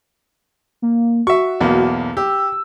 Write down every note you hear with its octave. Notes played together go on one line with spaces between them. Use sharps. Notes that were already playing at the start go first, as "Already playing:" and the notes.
A#3
F#4 E5 C#6
B1 E2 A#3
G4 E6